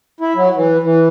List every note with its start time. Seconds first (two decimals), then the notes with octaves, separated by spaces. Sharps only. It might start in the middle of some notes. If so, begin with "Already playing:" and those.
0.20 E4
0.36 F#3
0.56 E3
0.83 E3